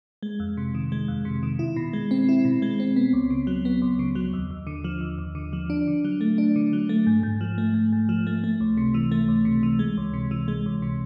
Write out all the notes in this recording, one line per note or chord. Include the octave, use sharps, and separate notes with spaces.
G#3
F2
C3
D#3
G#3
F2
C3
D#3
E4
B2
G#3
C4
E4
B2
G#3
C4
B3
C#2
C#3
F#3
B3
C#2
C#3
F#3
D#2
D#2
D3
F3
D#2
D#2
D3
F3
D4
D3
F#3
A3
D4
D3
F#3
A3
G#2
G#2
F3
A3
G#2
G#2
F3
A3
A3
C#2
C3
E3
A3
C#2
C3
E3
G#3
C#2
C3
E3
G#3
C#2
C3